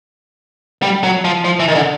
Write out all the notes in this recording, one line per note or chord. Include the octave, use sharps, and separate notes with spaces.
G3
F#3
F3
F3
E3
D#3
D3